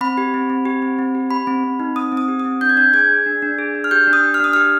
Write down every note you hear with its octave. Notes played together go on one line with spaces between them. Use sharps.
C4 B5
G4
C4
C4
G4
C4
C4
G4
G4 B5
C4
C4
D#4
C4 D#6
C4
D#6
G4
D#6
C4
D4 G6
G#6
D4 G6
G#4 G#6
G#4
D4
D4
G#4
D4
F6
G4 G6
D4
D#6
G4
F6
D4 D#6
G4 F6